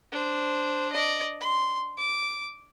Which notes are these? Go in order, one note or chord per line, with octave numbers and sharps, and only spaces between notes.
D4 C5
D5 D#5
C6
D6